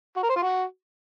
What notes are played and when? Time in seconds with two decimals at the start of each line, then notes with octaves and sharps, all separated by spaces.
0.17 F#4
0.23 A#4
0.29 C5
0.36 F4
0.42 F#4